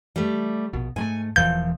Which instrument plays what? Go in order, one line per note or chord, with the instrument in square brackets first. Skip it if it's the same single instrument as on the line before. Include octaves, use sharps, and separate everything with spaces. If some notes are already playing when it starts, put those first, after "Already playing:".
[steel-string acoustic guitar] G3 A3
[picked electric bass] A#1 B2
[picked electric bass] G#2 G#3 A3 [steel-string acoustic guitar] G#5
[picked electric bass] E1 A#2 E3 [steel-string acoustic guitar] F3 [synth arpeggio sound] G6